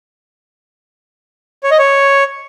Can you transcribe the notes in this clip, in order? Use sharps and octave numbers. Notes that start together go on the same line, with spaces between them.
C#5
D#5
C#5